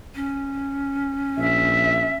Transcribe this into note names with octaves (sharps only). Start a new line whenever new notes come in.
C#4
A#1 E5